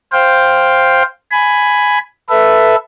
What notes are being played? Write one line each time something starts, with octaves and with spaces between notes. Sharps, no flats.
C5 F5 G5
G#5 B5
A4 B4 E5